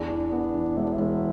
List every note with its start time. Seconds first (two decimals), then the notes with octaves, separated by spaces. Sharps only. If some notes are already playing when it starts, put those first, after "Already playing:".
Already playing: E2 D4
0.11 E3
0.32 B3
0.54 E3
0.77 E1 E4
0.84 D4
0.93 E4
0.98 E1